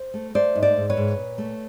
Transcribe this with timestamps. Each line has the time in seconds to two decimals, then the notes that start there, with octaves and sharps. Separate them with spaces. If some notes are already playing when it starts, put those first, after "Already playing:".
Already playing: C5
0.14 A3
0.35 A3 C5 D5
0.55 G#2
0.62 C5 D5
0.77 G#2
0.90 B4 C#5
0.97 G#2
1.17 A#2
1.38 A3